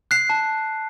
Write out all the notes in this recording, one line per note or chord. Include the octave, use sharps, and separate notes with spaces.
F#6 C7
A5